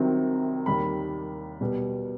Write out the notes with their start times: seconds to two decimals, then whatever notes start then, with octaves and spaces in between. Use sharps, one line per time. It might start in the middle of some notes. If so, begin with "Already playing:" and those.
Already playing: C2 C3 D#3 F#3 C4
0.66 D#2 D#3 G3 B5
1.61 B2 G3 B3